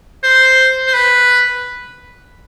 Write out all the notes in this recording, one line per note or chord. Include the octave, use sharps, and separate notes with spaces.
C5
C5
B4